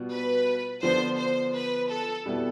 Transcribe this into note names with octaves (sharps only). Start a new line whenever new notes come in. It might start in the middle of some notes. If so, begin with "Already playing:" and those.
Already playing: B2 G3 B3 F4
B4
D3 F3 B3 C5
C5
B4
A4
B2 G3 B3 E4 A4